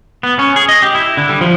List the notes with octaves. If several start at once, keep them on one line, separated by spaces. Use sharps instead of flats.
B3
C#4
G#4
D#5
G4
E4
D3
G3
F3